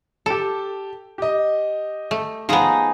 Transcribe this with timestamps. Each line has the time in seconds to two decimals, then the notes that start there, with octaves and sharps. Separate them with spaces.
0.26 G4 A4 A5
1.18 G4 D#5
2.11 A3
2.49 F3 B3 D#4 G#4 A#5